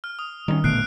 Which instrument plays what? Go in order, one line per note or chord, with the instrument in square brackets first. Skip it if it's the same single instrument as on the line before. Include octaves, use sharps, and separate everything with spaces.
[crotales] F6
D#6
[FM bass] D#3 [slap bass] G3 G#3 C#4
[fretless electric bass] A1 A#2 B3 [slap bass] D3 A3 [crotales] F#6 C7 D7